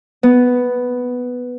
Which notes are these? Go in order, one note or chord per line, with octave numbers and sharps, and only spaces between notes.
B3